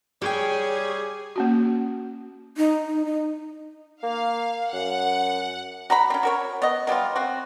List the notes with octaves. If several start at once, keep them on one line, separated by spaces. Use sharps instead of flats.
G3 G#4 C#5 G5
A#3 C#4 F#4
D#4
D#4
D#4
A#3 F5
F#2 F#5
F#4 A#5 B5
C4 C#4
F#4 A#4 C#5
B3 D#5
F#3 G3 B3 F4
C4 F#4